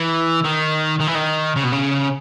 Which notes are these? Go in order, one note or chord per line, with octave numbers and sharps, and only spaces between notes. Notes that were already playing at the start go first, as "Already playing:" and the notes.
Already playing: E3
D#3
D#3
E3
D#3
C#3
B2
C#3